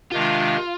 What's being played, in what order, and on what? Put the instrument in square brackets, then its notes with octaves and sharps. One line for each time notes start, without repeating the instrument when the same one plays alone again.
[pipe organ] C3 D#3 G#3 D4 [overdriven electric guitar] F4